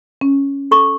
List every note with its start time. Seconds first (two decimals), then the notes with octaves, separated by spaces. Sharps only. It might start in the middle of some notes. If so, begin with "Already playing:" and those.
0.21 C#4
0.71 A4 C#6 D6